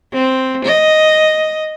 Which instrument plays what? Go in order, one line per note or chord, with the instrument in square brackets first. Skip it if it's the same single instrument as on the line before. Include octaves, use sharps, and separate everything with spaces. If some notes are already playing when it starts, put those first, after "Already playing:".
[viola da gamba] C4
D#5